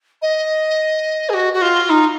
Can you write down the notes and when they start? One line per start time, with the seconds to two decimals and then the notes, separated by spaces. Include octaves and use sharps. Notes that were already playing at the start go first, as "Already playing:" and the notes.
0.22 D#5
1.29 G#4
1.34 F#4
1.53 F#4
1.62 F4
1.90 D#4